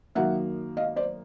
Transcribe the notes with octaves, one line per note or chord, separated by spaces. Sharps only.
F#2 D#3 F#3 A#3 E5 F#5
D#5 F5
C5 D5